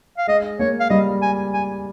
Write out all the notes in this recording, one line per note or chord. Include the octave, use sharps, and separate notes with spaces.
F5
G#3 D#5
A#3 C#5
F5
G3 D#5
G#5
G#5